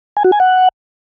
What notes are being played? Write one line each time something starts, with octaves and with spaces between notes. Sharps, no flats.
G#5
F#4
G#5
F#5